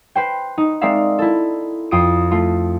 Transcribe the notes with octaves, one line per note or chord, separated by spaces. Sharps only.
B4 C5 G5
D#4
G#3 C4 A#4 D5 E5 F5
E4 A4
F2 F4 D#6 D7
A3 F4